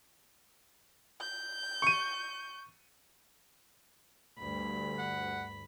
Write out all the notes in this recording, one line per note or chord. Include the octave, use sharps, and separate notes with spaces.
G6
C#6 D#7
D2 G2 B5
F#5